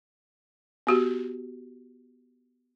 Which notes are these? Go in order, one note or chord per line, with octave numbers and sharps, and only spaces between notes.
B3 F#4 G4